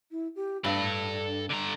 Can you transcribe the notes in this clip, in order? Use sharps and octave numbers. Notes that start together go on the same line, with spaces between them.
E4
G4
G2 D4 A4 B5
D3 A#5